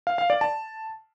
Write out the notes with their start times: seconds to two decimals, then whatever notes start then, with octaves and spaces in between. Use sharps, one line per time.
0.07 F5
0.18 F5
0.30 D5
0.41 A5